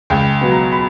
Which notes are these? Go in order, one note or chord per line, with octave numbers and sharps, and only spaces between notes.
C#2 G5
B2 F#3 B3
A#5
B5